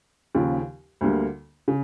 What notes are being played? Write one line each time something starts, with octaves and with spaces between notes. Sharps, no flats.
D#2 C#3 F3
D2 D3 G3 A#3
C#3